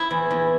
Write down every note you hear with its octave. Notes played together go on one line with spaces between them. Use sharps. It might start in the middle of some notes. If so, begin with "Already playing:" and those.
Already playing: E4 E5
E2
E2